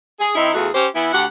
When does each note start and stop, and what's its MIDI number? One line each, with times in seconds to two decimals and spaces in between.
0.20 0.34 68
0.35 0.53 51
0.35 0.53 60
0.35 0.53 63
0.35 0.53 64
0.54 0.69 40
0.54 0.69 57
0.54 0.69 65
0.54 0.69 66
0.54 0.69 68
0.74 0.87 61
0.74 0.87 67
0.74 0.87 72
0.95 1.08 52
0.95 1.08 59
0.95 1.08 64
1.13 1.24 38
1.13 1.24 67
1.13 1.24 78